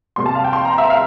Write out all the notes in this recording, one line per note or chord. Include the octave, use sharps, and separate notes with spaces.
C3 G3 A#3 C6
A5
F5
G5
C6
A#5
E5
F5